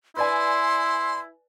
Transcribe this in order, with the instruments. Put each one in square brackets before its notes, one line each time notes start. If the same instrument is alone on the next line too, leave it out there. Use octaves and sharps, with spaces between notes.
[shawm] E4 [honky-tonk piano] B4 D5 G#5 [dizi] C6